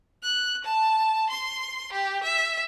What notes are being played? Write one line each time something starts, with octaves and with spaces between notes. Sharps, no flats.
F#6
A5
C6
G4
E5